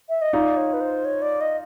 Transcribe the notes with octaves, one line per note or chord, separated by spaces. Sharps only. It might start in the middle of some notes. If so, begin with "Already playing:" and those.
E5
D#5
D#4 F4 D5
C#5
B4
C5
C#5
D5
D#5